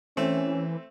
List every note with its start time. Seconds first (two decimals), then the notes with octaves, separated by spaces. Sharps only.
0.17 E3 A3 C4 C#4